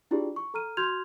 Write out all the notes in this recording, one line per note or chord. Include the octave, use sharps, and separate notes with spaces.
D4 E4 F4 G4 G#4 D5
C#6
A4 A#5 F6 D#7
F#4 C6 F6 G6 G#6 F7